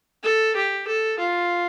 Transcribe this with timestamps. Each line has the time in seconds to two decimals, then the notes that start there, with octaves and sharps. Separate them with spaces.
0.23 A4
0.56 G4
0.87 A4
1.19 F4